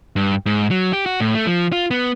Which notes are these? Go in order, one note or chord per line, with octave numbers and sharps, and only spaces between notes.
G2
G#2
F#3
G4
F#4
A2
A3
F3
F4
B3